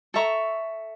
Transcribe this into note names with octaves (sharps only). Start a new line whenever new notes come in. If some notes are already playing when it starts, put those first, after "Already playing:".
A4 E5 A#5 C#6